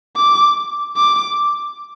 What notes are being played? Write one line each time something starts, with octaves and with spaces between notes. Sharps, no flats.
D6
D6